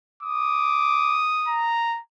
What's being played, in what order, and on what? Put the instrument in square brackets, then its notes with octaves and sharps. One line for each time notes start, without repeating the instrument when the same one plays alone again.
[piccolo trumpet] D6 [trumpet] D#6
[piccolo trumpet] A#5